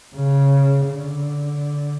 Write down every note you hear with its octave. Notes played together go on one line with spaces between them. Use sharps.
C#3
D3